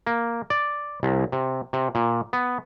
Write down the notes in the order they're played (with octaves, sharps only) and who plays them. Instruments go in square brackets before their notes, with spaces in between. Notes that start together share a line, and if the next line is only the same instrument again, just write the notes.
[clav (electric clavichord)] A#3
D5
C2
C3
C3
A#2
B3